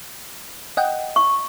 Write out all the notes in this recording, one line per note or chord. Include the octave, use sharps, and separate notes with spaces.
D#5 F#5 G5
C#6